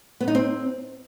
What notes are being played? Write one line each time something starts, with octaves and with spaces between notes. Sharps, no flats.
B3
D#4
C4